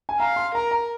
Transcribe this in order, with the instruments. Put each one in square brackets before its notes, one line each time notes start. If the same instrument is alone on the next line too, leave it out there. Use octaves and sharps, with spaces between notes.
[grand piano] G#5
[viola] F5 [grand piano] A#5
[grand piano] C6
[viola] A#4 [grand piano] A#5
[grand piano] A#5